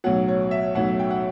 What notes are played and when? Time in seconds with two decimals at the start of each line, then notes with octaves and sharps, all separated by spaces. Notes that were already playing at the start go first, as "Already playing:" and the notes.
0.04 B1 A2 F#3 F#5
0.28 C#5
0.51 E5
0.75 B1 A2 F#3 F#5
0.99 G5
1.11 F#5